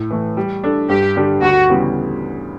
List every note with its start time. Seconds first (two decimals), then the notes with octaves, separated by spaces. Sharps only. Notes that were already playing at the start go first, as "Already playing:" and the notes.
Already playing: A2
0.10 E3 A3
0.37 G3
0.64 D4 A4
0.89 G2 G4
1.16 D3 G3 D4 G4
1.42 D2 F#4
1.69 C#3 E3 G3 B3